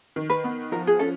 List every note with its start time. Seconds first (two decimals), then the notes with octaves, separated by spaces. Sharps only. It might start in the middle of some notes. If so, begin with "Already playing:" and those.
0.16 D#3
0.30 B4
0.44 B3
0.72 F3 A#4
0.87 G#4
0.99 C#4 A4